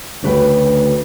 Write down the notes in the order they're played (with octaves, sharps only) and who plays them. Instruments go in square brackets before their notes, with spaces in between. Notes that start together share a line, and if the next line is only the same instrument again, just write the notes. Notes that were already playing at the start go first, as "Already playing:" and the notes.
[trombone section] D2 [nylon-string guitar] C#3 B4 G5